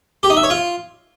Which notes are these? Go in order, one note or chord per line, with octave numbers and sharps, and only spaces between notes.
G4
D#4
E5
C#5
F4